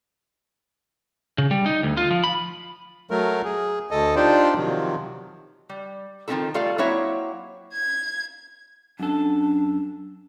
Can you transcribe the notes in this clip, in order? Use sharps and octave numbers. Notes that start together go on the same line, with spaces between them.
C#3
G3
D#4
D2
F4
F3
B5
F#3 A3 A#4
G#4
D2 A4 D#5
D4 D#4 F4 G4 C5 D5
C3 D#3 F3 F#3
G3
D#3 F3 C4 C#4 E4 A4
G3 A3 F4 A4 D5 F5
F#3 A#3 C4 E4 C#5 E5
G#6
F#2 D4 A4